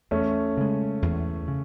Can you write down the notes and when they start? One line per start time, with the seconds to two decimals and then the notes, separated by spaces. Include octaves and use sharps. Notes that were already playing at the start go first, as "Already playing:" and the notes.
0.11 E2 A3 C#4
0.57 C#3 G#3
1.02 E2
1.48 C#3